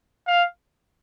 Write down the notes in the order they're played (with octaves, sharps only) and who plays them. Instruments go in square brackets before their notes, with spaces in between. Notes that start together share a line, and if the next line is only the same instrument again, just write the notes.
[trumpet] F5